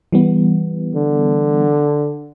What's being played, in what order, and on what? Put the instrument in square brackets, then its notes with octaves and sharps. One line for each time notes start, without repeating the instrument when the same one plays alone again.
[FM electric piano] E3 G3 B3
[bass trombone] D3